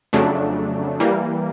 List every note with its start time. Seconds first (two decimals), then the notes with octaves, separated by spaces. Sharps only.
0.13 F2 C#3 F#3 A3 D4
1.00 E3 G3 A#3